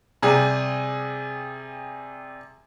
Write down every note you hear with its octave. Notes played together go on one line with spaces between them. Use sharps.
C3 G3 G#4